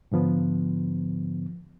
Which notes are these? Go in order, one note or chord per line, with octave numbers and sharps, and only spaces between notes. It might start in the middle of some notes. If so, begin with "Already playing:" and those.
G#2 D3 F3 B3